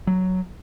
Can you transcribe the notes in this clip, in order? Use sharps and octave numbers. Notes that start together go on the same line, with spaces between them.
F#3